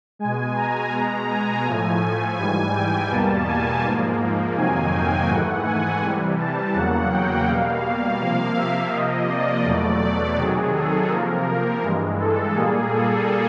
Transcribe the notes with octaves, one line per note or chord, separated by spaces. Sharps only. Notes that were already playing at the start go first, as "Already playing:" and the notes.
B2 G#3 G#5
A#5
B2 G#3 A#5
G#5
A2 F3 A3
G#5
G#2 E3 G3 G#5
G5
E2 B2 G3 A#3 A5
G#5
G#2 F3 A#3
F2 C3 D#3 F#3 A#3 G#5
G5
G#2 E3 A3 F#5
G#5
C3 E3 G3
A5
E2 C#3 F#3 A#3 F#5
G5
B2 G3 A#3 F5
C3 F3 A#3
E5
C3 F3 A#3 D#5
D5
E2 B2 F#3 A3
D5
C3 D#3 F#3 G#4
A4
C3 F3 A#3 A#4
A#4
G2 E3 G#3
A4
A#2 G3 A#3 G#4
A4